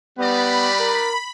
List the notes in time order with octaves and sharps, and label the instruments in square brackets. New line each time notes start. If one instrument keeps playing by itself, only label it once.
[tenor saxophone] G3 [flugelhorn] B3 [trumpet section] D#4 B4 D5 [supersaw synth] B5
[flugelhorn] A#4